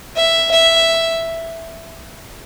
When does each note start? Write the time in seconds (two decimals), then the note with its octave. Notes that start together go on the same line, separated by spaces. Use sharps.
0.16 E5
0.51 E5